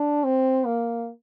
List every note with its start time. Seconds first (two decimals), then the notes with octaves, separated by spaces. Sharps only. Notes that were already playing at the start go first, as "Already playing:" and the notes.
Already playing: D4
0.24 C4
0.65 A#3